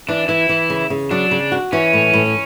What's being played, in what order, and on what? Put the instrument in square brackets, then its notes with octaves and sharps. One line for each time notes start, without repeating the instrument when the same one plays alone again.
[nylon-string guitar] E3 [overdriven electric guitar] D4
[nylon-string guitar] E3 [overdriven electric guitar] E4
[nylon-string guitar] E3
C#3
C#3
[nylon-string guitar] F#3 [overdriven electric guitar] D4
[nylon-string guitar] C#3
F#4
[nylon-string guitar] E3 [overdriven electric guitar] C#4
[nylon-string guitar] A2
A2